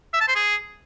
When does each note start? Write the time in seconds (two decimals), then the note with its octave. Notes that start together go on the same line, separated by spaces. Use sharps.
0.13 E5
0.21 A5
0.28 C5
0.35 G#4